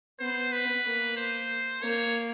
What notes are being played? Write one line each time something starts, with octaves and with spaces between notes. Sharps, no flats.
B3 C5
B4
A#3
C5
A#3 C#5